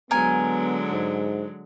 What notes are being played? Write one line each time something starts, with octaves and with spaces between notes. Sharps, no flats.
D3 F#3 G#3 B3 A#4 G#5
G#2